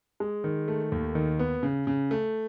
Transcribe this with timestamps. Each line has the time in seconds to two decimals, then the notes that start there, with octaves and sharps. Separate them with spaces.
0.20 G#3
0.44 D#3
0.68 A3
0.92 D#2
1.15 D#3
1.39 B3
1.63 C#3
1.87 C#3
2.11 A3